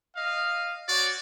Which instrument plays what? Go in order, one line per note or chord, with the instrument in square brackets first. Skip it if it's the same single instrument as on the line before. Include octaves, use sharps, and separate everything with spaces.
[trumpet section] D#5 F5
[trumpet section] F#4 C#5 [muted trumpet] D5